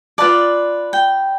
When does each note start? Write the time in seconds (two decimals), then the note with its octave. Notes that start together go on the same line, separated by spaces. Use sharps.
0.18 F4 B4 D5 A5
0.93 G5